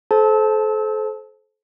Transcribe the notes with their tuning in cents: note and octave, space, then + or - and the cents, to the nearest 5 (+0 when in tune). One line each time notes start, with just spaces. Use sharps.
A4 -35 C5 +0 A5 -10